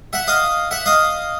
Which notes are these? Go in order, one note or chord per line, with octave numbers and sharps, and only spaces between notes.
E5 F#5
D#5 F5
E5 F#5
D#5 F5